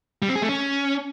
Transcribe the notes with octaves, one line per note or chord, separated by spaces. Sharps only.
G3
C4
G#4
A3
C#4